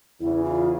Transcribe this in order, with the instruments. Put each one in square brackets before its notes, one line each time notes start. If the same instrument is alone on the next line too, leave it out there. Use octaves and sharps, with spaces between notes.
[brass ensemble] E2 C#3 E3 [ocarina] E4
[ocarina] F4